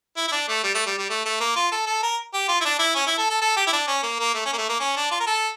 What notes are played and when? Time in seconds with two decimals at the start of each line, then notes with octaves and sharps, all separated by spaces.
0.17 E4
0.28 E4
0.32 D4
0.48 A3
0.63 G3
0.74 A3
0.86 G3
0.98 G3
1.10 A3
1.25 A3
1.40 A#3
1.56 F4
1.72 A4
1.86 A4
2.02 A#4
2.34 G4
2.48 F4
2.61 E4
2.65 D4
2.79 E4
2.95 C#4
3.07 E4
3.18 A4
3.30 A4
3.41 A4
3.57 G4
3.67 E4
3.73 D4
3.87 C#4
4.03 A#3
4.19 A#3
4.34 A3
4.45 C#4
4.53 A#3
4.58 A3
4.69 A#3
4.80 C#4
4.97 D4
5.11 F4
5.20 A#4
5.27 A4